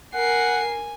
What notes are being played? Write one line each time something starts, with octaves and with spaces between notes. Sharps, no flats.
A#4 F#5 G#5 C7